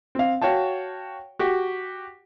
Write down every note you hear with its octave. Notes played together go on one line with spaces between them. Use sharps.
C4 F5
F#4 C#5 F5 G5 A5
F#4 G4